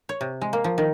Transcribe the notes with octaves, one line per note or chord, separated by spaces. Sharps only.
C#5
C3
G#3
A#3
F3
D#3